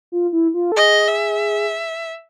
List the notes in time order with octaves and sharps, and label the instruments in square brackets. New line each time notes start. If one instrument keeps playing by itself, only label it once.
[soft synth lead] F4
E4
F4
A4
[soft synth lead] G#4 [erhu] D#5
[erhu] E5